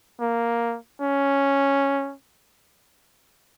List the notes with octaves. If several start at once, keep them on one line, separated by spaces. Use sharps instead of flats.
A#3
C#4